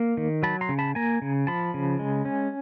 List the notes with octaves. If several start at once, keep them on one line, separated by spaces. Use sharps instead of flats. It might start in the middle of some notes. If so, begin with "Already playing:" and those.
Already playing: A#3
D#3
F#3 A5 B5
A#5 C6
C#3
A5 B5
A#3 G#5 A#5
C#3
F3 A5 B5
C#3
G#3
C#4